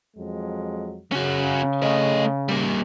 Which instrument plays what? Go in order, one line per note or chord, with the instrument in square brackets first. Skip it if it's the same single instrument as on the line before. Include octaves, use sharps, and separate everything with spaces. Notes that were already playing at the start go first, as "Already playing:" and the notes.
[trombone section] F2 F#3 G#3
[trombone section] C#3 [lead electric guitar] C#4 F#4
[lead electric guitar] A3 D#5
G3 A#3